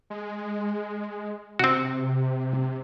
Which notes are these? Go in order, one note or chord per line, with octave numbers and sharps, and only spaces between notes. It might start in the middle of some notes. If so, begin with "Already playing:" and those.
G#3
C3 C4 F#4